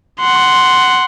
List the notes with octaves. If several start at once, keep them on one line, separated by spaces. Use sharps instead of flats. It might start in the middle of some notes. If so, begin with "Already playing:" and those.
F#5 C6